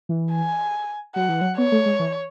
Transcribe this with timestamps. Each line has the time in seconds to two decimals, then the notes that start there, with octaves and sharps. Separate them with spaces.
0.09 E3
0.33 G#5
1.15 F#3 F#5
1.29 E3
1.41 F#3
1.58 B3 C#5
1.72 A3
1.86 G#3
2.00 E3